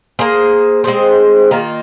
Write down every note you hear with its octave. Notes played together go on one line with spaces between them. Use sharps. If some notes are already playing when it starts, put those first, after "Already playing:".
A#3 G#4 C5
G#3 C4 G#4 C5
D#3 A#3 F4